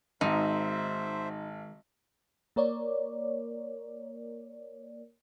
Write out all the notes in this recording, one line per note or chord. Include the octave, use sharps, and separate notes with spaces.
G#1 D#3 G#3 D#4 F#4 C5 E5
A#3 A#4 C#5 D5